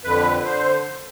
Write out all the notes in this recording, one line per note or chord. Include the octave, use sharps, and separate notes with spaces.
F2 D3 B4
D3 C5